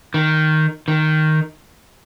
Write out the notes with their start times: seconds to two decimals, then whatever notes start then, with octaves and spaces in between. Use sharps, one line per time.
0.14 D#3
0.88 D#3